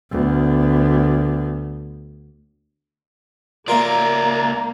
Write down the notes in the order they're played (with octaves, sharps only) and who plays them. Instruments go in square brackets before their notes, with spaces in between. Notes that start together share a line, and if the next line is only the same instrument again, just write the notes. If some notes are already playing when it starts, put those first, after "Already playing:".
[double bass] D2 B3
[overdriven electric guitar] C#2 D5 [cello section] A#3 [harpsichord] F4 A#4 [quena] A#5